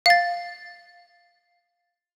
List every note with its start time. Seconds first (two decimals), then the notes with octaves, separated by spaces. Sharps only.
0.06 F5 A6